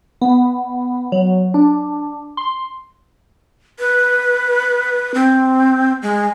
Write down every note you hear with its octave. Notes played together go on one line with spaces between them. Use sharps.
B3
F#3
D4
C6
B4
C4
G#3